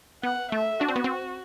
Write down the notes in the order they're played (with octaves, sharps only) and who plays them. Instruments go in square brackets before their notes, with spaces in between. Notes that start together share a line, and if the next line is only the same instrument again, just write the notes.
[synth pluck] B3 [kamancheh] F#5
[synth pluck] A3 [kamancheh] E5
[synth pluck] D4 [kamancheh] F#4
[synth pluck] C4
B3
C4